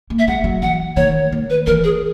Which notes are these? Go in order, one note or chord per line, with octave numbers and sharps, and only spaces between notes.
A#3
E5
G#3 F#5
F#3
E3 F#5
D#3 C#5
D#3
B4
E3 A#4
G#4